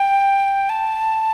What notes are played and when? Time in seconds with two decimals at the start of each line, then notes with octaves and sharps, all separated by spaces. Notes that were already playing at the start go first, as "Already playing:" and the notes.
Already playing: G5
0.69 A5